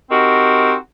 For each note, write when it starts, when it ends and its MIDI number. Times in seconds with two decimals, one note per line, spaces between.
0.11 0.74 60
0.11 0.74 63
0.11 0.74 66
0.11 0.74 67
0.11 0.74 70